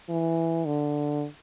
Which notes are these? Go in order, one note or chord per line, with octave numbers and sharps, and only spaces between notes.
E3
D3